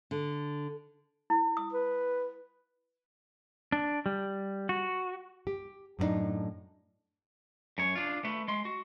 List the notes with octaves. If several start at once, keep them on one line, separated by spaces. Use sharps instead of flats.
D3
E4
D#6
B4
D4
G3
F#4
G4
F#2 A2 A3 D4 D#4
F#2 C#5
D4 F4
A3 B4
G#3 C6
F#4